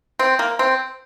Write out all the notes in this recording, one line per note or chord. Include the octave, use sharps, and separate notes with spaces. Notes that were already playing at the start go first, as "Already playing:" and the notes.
C4
A#3
C4